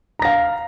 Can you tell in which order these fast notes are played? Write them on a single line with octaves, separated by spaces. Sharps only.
A#5 A#6 F5